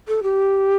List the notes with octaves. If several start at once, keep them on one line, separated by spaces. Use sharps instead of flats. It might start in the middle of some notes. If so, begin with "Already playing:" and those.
A4
G4